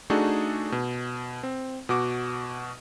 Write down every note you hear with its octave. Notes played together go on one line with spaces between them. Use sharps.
A3 D4 D#4 F#4 G#4 A4
B2
C4
B2 F#4 D6